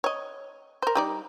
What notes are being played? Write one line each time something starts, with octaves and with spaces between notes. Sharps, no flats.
C#5 D#5
A#4 C5
G3 D#4 D5